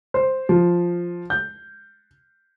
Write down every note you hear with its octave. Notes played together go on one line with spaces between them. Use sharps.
C5
F3
G6